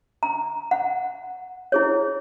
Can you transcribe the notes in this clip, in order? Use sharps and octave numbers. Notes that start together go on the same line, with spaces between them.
A#5
F#5
E4 G#4 C#5